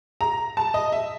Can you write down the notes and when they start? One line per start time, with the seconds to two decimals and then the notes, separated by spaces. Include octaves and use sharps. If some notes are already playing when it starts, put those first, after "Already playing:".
0.21 A#5
0.57 A5
0.74 D#5
0.92 E5